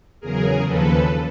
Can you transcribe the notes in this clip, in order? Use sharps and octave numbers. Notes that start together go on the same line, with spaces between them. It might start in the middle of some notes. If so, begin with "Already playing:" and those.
E2 C#3 F#3 G#4 A#4
D#2 C#3 F3 A4 B4